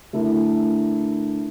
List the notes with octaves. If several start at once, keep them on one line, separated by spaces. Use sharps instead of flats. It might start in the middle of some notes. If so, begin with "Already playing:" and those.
D3 A3 E4 A#4